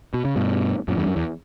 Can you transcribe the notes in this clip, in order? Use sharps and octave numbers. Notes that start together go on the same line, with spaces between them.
B2
C#3
G2 B2
F#2 A#2
E2 G2
F#2
E2